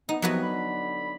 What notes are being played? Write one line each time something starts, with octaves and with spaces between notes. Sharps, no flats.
B3 D#4
C3 F3 F#3 B3 F#4
D3 B5